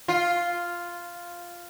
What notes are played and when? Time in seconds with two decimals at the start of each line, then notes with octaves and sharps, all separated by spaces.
0.08 F4